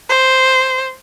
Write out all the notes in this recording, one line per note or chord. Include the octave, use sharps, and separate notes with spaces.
C5